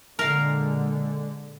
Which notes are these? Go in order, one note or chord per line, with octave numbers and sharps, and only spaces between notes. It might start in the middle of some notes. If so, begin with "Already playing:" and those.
A#2 D3 G#3 A#4 F5